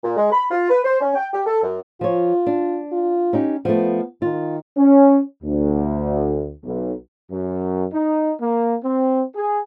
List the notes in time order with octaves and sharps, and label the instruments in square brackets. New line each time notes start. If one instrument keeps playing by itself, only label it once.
[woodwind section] A#2
G#3
B5
F4
B4
C5
C#4
G5
G4
A4
F#2
[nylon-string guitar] F3 C#5 [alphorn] F4
[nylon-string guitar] D4
[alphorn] F4
[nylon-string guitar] C#4 D#4 G4
[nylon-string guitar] F3 A3 [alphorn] B3
[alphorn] D#3 [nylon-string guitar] F4
[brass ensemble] C#4
D2
B1
[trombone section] F#2
D#4
A#3
C4
G#4